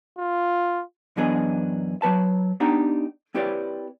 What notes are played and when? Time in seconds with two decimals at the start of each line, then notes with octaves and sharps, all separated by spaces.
0.18 F4
1.17 F#2 E3 B3 D4 G#4 D#5
2.02 F#3 G#3 B4 A5
2.60 B3 D4 D#4 G4 F#5 A#5
3.35 C4 E4 G4 B4 C#5 D5